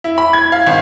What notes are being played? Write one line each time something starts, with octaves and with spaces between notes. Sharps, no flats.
E4
B5
G#6
F5
G#1